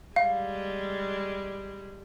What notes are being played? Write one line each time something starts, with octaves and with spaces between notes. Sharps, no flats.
G3 G#3 F5